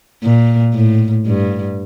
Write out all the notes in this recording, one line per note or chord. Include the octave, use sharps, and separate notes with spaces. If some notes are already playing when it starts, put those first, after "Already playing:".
A#2
A2
G2